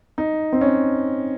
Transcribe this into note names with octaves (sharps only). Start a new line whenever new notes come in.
D#4
C4
C#4